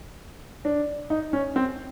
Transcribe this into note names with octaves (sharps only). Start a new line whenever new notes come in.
D4
D#4
C#4
C4